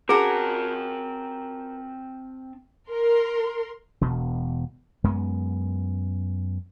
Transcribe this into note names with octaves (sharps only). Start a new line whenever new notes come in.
C4 C#4 F#4 G#4 A#4 A5
A#4 C6
E1 B2
F#2 G#3 B3